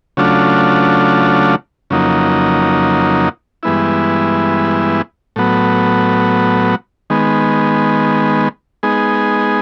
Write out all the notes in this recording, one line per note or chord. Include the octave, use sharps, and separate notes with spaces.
C#3 F#3 A3 D4 F4
F2 C#3 F#3 A#3 D#4
G2 E3 G#3 B3 E4
A2 F#3 B3
D#3 G#3 B3
G#3 B3 D#4 G#4